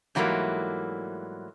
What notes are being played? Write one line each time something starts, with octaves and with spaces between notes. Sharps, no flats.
G#2 E3 F#3 G3 A3 A#3